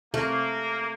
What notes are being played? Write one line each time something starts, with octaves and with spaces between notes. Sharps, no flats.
C3 A3 A#3